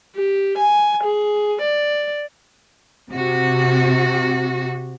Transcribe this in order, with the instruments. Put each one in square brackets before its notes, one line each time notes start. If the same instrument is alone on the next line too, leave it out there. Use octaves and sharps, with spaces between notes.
[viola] G4
G#5
G#4
D5
[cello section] C3 F#4